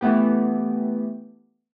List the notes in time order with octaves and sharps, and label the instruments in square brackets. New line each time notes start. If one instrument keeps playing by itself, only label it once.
[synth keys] E3 A3 B3 G4